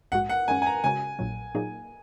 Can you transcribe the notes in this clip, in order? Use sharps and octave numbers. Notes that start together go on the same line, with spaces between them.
A#1 G#2 G#3 F#4 F#5
F#5
F#2 D#3 G#3 C#4 G#5
G#5
A#5
C#3 G#3 C#4 F#4 C#5 G#5
A#1 A#2 F#3
A#2 F#3 A#3 D#4 G#4